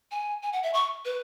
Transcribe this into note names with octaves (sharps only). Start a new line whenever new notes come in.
G#5
G#5
F#5
E5
C#6
B4